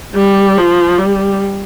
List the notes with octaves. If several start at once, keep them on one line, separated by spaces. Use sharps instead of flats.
G3
F3
G3